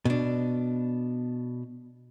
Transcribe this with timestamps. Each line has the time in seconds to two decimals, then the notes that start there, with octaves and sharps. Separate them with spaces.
0.05 B2 D4